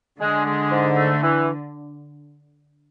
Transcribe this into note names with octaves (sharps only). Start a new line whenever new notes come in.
D3 G#3
G#3
G#2
A3
E3